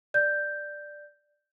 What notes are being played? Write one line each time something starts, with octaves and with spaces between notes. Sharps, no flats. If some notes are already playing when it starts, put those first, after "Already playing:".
D5 G6